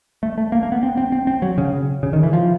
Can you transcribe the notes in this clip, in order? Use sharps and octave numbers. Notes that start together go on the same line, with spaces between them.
A3
A3
A#3
A#3
B3
C4
C4
C4
C4
F#3
C#3
C#3
D#3
E3
F3